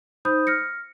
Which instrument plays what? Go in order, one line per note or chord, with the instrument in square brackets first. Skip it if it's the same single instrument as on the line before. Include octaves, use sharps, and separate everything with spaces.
[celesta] D#4 C5 B5 D#6 G6
F6 A#6 C#7